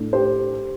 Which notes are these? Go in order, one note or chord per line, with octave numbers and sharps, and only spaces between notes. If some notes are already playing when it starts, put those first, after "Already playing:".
Already playing: A2 A3 D4
G4 C5